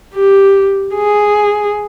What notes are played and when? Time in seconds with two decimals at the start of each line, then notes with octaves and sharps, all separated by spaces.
0.14 G4
0.95 G#4